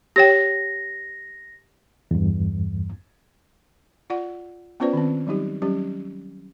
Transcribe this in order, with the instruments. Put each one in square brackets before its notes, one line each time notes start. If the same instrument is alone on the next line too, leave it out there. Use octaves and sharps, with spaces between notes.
[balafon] G4 C#5 G5 [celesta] A#6
[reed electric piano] E2 G2
[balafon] F4 D5 F#5
B3 C#4 F4 B4 C5 D5
D#3 C4
F#3 G3 D#4 G4
F#3 G3 C#4 G4